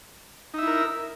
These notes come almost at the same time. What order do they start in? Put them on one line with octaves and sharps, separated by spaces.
D#4 E5 E4 A#4